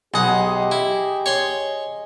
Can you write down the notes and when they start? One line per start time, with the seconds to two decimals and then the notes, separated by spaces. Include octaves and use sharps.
0.14 B1 G4 G#4 D#5 F#5
0.72 E4
1.26 C#5 C6